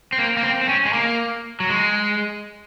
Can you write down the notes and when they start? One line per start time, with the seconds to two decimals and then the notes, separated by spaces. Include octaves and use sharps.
0.13 C4
0.18 A#3
0.37 A#3
0.43 C4
0.61 C4
0.69 C#4
0.85 G#3
0.93 A#3
1.60 F#3
1.69 G#3